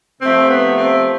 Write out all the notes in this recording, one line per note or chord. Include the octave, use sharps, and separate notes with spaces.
C3 F3 A3 C4
B3
C4